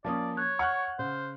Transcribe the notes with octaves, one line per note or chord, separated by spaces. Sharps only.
F3 A#3 C#4 D5 A5 D#6
C#5 F#6 G#6
F#5 C#6 F6 F#6
C#3 C5